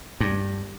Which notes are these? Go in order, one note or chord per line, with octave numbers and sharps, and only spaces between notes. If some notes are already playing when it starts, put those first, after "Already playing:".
G2